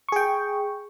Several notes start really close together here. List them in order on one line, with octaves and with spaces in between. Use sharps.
C#6 G#4 G5